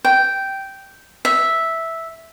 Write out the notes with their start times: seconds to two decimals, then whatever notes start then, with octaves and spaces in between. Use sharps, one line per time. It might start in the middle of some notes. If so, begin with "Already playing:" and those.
0.05 G5
1.25 E5